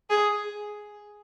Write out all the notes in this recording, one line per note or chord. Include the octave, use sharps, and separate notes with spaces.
G#4